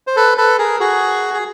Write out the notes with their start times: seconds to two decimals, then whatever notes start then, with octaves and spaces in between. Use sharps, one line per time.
0.07 C5
0.16 A4 B4
0.38 A4 B4
0.59 G#4 A#4
0.80 F#4 G#4
1.34 G#4